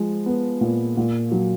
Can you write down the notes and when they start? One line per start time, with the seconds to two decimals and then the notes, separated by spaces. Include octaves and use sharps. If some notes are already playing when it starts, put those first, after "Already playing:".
Already playing: F3 G#3
0.26 B3
0.61 A#2
0.97 A#2
1.31 F#3